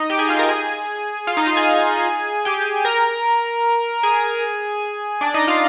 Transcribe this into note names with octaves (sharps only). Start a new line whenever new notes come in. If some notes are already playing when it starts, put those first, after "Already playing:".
Already playing: D#4 D#5
G4 G5
G#4 G#5
F4 F5
A#4 A#5
G#4 G#5
F4 F5
D#4 D#5
F4 F5
G#4 G#5
G4 G5
A#4 A#5
G#4 G#5
D4 D5
D#4 D#5
F4 F5